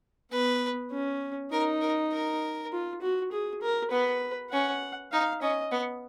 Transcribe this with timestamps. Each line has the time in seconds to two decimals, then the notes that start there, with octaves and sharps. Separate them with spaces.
0.32 B3 B4
0.91 C#4
1.51 D#4 A#4
1.81 A#4
2.12 A#4
2.72 F4
3.01 F#4
3.32 G#4
3.62 A#4
3.91 B3 B4
4.51 C#4 F#5
5.12 D#4 F5
5.41 C#4 D#5
5.72 B3